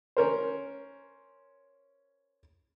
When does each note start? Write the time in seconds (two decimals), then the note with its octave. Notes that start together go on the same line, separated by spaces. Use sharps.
0.17 C#4 A#4 C5